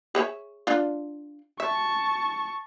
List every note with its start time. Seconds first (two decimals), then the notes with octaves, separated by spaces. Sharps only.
0.15 G#4 C#5 E5
0.67 D4 F4
1.60 E5 A5 C#6